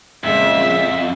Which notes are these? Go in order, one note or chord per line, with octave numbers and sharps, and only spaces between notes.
F2 A#2 C#3 G#3 E5